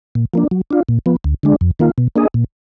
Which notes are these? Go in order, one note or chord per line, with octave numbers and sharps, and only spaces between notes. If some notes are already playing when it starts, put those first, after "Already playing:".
A#2
F3 A#3 D4
F#3
D4 F4
A#2
F3 B3
D2
D3 G#3 D4
F2
D#3 A#3 F4
B2
A#3 D4 G#4 D#5
A#2